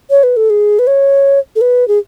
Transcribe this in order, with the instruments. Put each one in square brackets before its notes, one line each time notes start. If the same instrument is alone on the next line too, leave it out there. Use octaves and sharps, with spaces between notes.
[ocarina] C#5
B4
A4
G#4
B4
C#5
A4
B4
G#4